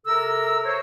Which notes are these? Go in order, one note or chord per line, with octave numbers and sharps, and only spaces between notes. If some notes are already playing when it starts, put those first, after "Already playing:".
C3 A4 A#4 A#5 E6
C5 C#5